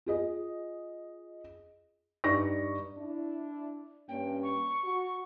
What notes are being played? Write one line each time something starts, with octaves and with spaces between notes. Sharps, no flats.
F4 G#4 D#5
G2 D#4 D5 C#6 A#6
D4 E4
G2 A#3 C#4 G5
C#6
F#4